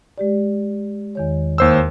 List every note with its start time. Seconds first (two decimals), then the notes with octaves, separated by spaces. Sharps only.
0.18 G#3 G4 D5
1.15 E2 D#3 C#5
1.58 D#2 C5 E6